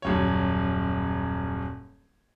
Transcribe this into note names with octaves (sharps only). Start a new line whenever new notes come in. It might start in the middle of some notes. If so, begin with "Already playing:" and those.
D#1 F#2 C#5